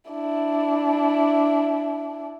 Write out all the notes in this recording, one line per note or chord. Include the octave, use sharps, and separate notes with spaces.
D4 E4